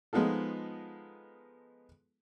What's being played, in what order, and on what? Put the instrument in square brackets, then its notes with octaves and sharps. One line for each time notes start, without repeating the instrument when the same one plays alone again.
[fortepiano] F3 G#3 B3 D#4 F4 A4